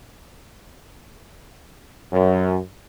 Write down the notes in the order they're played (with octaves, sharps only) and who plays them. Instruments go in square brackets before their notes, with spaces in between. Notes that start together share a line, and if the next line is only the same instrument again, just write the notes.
[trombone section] F#2